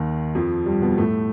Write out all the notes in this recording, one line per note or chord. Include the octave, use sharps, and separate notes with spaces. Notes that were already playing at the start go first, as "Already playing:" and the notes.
Already playing: D#2 D#3
F2 F3
G2 G3
B2 B3
A2 A3